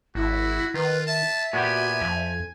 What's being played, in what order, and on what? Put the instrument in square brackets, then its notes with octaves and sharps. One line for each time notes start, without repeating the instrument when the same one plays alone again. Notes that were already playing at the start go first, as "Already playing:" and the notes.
[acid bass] G#1 [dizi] E4 [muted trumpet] F#4
[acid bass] D#3 [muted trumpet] F4 [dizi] B4
[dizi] E5 [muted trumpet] A5
[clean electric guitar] A#2 B3 G4 [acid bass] F#4 [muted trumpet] G#5
[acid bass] F2 [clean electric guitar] F3